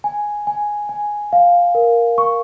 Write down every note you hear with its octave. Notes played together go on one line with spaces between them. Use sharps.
G#5
G#5
G#5
F5
A#4
C#6